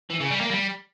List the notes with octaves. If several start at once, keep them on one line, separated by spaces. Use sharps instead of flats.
E3
C#3
G3
A#3
G3